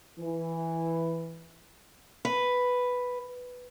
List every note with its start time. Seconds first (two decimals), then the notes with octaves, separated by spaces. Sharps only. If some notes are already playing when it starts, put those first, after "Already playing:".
0.18 E3
2.25 B4